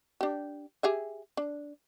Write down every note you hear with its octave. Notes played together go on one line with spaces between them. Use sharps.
D4 G4
G4 G#4 E5
D4